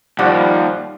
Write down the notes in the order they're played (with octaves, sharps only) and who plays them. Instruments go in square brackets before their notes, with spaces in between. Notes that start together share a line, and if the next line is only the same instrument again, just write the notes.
[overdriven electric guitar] D#2 [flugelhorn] F3 [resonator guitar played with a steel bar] G3 [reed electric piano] F#5 D6 F#6